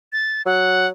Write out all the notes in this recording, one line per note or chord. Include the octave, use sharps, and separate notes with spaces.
A6
F#3 F#5